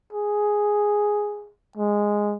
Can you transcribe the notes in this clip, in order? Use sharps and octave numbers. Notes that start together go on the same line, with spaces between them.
G#4
G#3